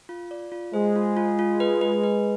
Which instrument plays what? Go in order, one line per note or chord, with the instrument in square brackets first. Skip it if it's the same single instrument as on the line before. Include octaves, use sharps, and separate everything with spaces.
[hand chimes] F4
D5
F4
[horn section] G#3 [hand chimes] C5
[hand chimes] F4
F4
F4
B4
B4
B4